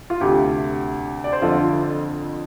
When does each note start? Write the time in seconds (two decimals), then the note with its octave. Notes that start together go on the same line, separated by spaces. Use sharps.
0.10 F4
0.20 D2 C3 G4
1.24 D5
1.32 C5
1.42 F2 D3 F4 A4